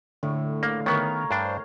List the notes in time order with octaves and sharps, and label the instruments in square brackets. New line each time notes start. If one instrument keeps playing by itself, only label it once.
[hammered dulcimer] A2 [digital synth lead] D3
[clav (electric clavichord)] A#3 [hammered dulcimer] F5
[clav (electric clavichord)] D#3 B3 [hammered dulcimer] A#4 C#5
[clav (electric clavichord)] G2 D4 [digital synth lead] C5